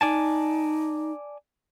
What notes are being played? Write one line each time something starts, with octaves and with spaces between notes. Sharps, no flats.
D#4 D5 G#5 A5